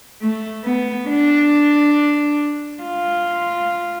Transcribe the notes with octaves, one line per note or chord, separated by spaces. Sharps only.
A3
B3
D4
F4